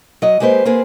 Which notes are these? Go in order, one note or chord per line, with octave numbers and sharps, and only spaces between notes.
F#3 D#5
G#3 A#3 G4 B4 C5
A#3 C4 G#4 B4 C5